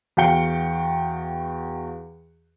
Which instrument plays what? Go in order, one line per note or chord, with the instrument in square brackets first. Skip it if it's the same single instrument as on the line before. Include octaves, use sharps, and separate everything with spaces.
[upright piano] E2 F#4 F5 G5 C#7 G7